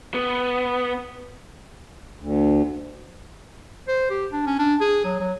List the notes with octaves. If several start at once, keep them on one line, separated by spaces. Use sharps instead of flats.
B3
D2
C5
G4
D4
C#4
D4
G#4
F#3
F#3